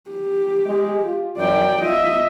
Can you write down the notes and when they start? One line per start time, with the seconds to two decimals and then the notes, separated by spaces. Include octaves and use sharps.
0.10 G4
0.66 G#3
1.04 F4
1.38 F#2 D5 G5
1.82 F4 D#5 E5